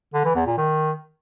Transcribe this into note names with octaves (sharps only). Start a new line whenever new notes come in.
D3
E3
E2
A#2
D#3